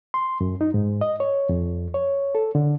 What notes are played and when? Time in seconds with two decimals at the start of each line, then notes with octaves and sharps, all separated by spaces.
0.14 C6
0.41 F#2
0.61 D#4
0.74 G#2
1.01 D#5
1.20 C#5
1.49 F2
1.94 C#5
2.35 A4
2.55 D3